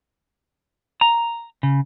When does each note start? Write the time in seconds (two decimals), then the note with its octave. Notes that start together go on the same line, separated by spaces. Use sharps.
1.01 A#5
1.63 C#3